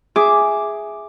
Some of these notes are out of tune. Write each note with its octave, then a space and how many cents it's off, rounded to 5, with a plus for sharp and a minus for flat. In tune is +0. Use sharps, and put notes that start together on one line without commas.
G#4 +0 E5 +0 D6 +0